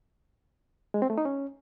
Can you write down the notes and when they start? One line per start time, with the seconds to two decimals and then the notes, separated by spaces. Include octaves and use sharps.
0.94 G#3
1.02 C4
1.10 A3
1.18 D#4
1.25 C#4